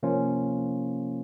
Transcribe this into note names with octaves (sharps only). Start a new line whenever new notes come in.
C3 F3 A#3 C#4 F4